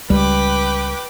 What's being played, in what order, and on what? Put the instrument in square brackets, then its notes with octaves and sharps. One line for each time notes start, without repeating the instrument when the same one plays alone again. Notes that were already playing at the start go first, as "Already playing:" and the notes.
[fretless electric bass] C#2 G3 [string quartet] B4 G5 D6